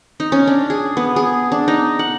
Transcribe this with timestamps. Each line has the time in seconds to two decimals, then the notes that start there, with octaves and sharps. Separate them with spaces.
0.20 D#4
0.32 C#4
0.47 D4
0.70 G#4
0.97 B3
1.16 G#4
1.52 D4
1.68 D#4
1.99 F#5